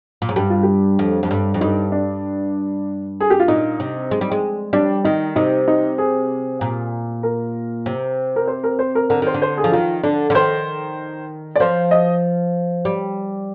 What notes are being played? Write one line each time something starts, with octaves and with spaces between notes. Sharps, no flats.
A#2
G#2
G2 G4
F4
G4
F2
F2
G2
F2
G2 D#4
D4
G#4
G4
F4
A#2 D#4
C3
G#3
G3
G#3
G3 D4
D#3 D#4
C3 D#4
D#4
G#4
A#2
A#4
C3
A#4
C5
A#4
C5
A#4
D3 A#4
D#3 C5
D3
C5
G#4
F3
D#3 F4
D3 D4
D3
D#3 C5
D5
F3 C5
D#5
G3